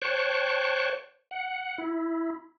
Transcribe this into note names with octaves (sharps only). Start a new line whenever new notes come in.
C5 C#5 G5 A5 C#6 F#6
F#5
E4